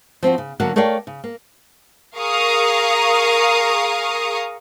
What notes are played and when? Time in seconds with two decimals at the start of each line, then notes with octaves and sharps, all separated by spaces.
0.23 F3 C4 F4 F#4
0.38 C#3
0.60 D3 F#3 A#3 F#4
0.76 A3 A#4 C#5 D5 F5 G5
1.07 C#3
1.24 A#3
2.17 G#4 A#4 F5 A#5 C#6 D#6